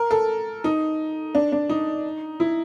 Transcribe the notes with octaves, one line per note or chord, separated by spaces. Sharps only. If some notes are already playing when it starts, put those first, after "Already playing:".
Already playing: A#4
A4
D#4
D4
D4
D#4
E4